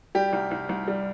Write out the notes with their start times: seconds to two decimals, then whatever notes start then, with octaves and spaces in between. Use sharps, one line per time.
0.15 G3 G4
0.33 C2
0.51 C2
0.69 C2
0.88 G3